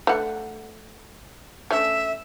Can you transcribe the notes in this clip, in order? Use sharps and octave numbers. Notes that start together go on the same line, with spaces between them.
A3 D4 F#5
A3 C#4 D4 E5